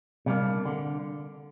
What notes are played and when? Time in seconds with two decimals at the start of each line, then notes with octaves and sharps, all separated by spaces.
0.26 C3 G3 A#3 D4
0.65 D3